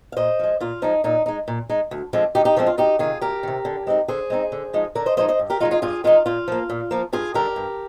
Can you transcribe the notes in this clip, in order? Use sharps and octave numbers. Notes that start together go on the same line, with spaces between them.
F5
A#2 C5 D#5
F3 G#3
A#2 F4
F3 G#3 D#4
A#2 D#4
G#3 D#4
A#2
G#3 D#4
D2
D3 F3 G#3 C4
D2 D#4 G4
D#4 G4
D3 F3 G#3 C4
F4
D2 D#4 G4
C3 D#3 F4 G#4
D2 G4 A#4
C3 D#3
D3
G#3 C4 D#4
D3 G#4 C5
G#3 C4 D#4
D3
F3 G#3 D#4
D3 A#4 D5
C5 D#5
F3 G#3 D#4 C5 D#5
C5 D#5
G2
G4 A#4
D#3 G#3 D#4 F4
F4 G#4
G2 F4 G#4
D#3 G#3 D#4 F4
A#2 F4
F3 A#3
A#2
F3 A#3
G2 F4 G#4
D3 G3 D4 G4 A#4
G2